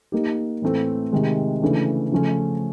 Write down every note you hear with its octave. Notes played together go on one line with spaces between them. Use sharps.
A#3 D#4 G4
A2 E3 A3 C4
C3 D#3 G#3
C#3 E3 A3 D4
C#3 F3 A3 C#4